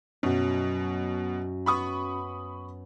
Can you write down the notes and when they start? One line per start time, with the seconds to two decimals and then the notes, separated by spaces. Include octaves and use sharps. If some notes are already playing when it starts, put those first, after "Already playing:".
0.23 F#2 B2 C#4 F#4
1.66 B3 B5 C#6 D#6